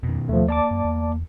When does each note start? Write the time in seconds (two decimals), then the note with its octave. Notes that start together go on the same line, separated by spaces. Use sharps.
0.03 F2 B2 D#3
0.29 D#2 F3 A3
0.49 A#3 D5 A5 D6
0.71 F#2
0.84 E2